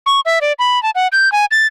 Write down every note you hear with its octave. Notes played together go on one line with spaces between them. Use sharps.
C#6
E5
D5
B5
A5
F#5
G6
G#5
A6